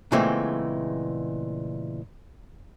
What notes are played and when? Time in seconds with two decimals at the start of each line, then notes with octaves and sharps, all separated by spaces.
0.12 A#2 C#3 E3 G#3 A3 C4